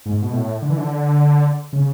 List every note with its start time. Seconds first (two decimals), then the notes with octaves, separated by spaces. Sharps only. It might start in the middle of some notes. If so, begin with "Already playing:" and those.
0.06 G#2
0.22 B2
0.33 A2
0.62 D3
0.70 E3
0.77 D3
1.73 C#3